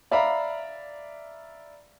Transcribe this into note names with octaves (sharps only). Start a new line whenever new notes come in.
D5 E5 F5 A#5 B5